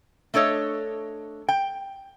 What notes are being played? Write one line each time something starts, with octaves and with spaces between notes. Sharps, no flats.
A3 D4 A4 C#5 D#5
G5